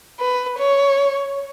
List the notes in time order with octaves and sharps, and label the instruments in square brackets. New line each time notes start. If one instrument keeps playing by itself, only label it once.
[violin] B4
C#5